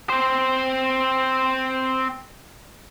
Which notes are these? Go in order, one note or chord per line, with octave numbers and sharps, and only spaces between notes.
C4 C5